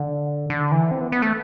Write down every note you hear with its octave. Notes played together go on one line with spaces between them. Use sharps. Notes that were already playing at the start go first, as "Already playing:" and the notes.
Already playing: D3
D3
E3
C4
B3
B3
A3